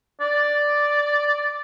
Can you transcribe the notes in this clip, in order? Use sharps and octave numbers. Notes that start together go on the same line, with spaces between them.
D5